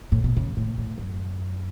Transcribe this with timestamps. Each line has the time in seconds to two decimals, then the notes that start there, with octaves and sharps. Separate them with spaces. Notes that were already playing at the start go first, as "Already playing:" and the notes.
0.12 A2
0.24 B2
0.37 C#3
0.57 A2
0.78 A2
0.98 F#2